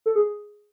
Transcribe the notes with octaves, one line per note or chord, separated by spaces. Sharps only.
A4
G#4